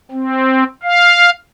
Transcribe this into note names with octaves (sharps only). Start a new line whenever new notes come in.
C4
F5